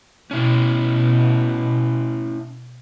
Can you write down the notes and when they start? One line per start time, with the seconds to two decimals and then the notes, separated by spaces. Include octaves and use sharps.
0.31 B2 C#4 E4